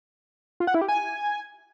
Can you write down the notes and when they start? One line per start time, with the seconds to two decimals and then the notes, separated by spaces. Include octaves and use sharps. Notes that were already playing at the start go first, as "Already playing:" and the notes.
0.60 F4
0.67 F#5
0.74 E4
0.81 G4
0.88 G#5